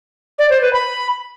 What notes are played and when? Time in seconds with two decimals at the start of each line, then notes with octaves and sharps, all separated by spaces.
0.38 D5
0.50 C5
0.61 B4
0.73 B5